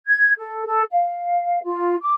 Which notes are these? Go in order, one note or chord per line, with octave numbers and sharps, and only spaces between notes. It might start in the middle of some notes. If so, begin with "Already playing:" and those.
G#6
A4
A4
F5
F4
D6